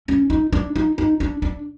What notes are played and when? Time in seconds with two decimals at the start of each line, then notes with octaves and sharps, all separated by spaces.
0.08 C#4
0.30 D#4
0.52 D4
0.76 D#4
0.98 D#4
1.20 D4
1.42 D4